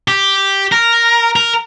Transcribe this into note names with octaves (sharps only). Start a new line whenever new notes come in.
G4
A#4
A#4